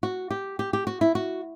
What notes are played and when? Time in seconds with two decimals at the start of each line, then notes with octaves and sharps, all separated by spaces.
0.03 F#4
0.30 G4
0.59 G4
0.73 G4
0.87 F#4
1.01 E4
1.15 F#4